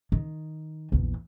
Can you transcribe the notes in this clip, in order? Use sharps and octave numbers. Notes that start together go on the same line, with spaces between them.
D#3
A#1 E2